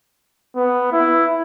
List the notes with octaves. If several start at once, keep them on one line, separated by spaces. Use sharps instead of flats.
B3
E4